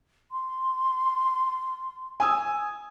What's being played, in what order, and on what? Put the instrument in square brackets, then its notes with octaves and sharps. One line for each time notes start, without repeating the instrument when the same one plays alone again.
[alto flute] C6
[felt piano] G#5 D#6 E6